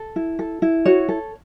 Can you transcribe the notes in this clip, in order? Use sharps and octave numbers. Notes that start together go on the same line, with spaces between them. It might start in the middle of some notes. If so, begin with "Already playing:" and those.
Already playing: A4
E4
A4
E4
F#4 C#5
A4